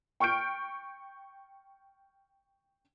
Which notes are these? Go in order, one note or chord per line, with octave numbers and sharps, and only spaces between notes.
G5 C#6 F6 G6 D7